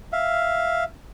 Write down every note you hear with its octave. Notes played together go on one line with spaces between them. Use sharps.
E5 F5